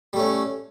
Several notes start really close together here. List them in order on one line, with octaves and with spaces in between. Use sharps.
G3 A3 C#4